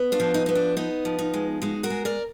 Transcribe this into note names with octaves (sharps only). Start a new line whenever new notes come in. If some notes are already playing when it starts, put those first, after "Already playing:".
Already playing: B3
D4 F4
F3
D#4
B3 D#4
D4
B3 D#4
F3
D#4
G#3
G#3 D#4 F#4
F#4 A#4
G#3
A#4 D5